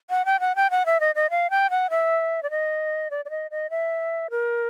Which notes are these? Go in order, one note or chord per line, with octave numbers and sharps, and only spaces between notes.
F#5
G5
F#5
G5
F#5
E5
D#5
D#5
F5
G5
F#5
E5
D5
D#5
D5
D5
D#5
D#5
E5
A#4